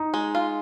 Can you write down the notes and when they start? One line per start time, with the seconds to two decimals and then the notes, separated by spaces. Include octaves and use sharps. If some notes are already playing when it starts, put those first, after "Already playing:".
Already playing: D#4
0.14 G#3
0.35 F4